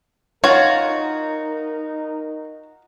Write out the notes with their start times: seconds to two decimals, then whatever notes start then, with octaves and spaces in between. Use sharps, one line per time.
0.44 D#4 F4 F#4 A#4 C#5